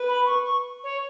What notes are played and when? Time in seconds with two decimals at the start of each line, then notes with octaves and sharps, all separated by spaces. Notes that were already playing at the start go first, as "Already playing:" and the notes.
Already playing: B4
0.08 B5
0.26 C#6
0.45 C#6
0.84 C#5